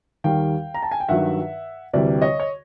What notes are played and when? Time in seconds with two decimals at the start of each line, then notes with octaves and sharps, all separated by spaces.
0.24 D#2 D#3 G3 F5 G5
0.74 A#5
0.83 A5
0.91 G#5
1.00 G5
1.09 G2 D#3 F#3 E5 F#5
1.93 D2 C3 E3 G3 D5 E5
2.22 C#5 D#5
2.40 C#5